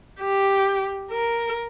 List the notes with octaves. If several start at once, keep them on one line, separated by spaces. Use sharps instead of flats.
G4
A#4